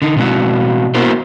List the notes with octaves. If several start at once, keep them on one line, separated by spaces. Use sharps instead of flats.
D3 D#4
B2 F#3 G#3 C4 E4 F#4
A#3 B3 E4 F#4 A#4 C5